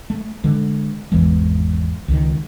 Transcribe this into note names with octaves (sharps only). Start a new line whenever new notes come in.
A3
D3 G#3
G#1 E2 E3 G#3
C#2 D#3